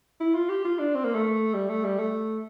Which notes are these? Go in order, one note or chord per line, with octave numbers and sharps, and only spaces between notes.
E4
F4
G4
F4
D4
C4
A#3
A3
G3
A3
G3
A3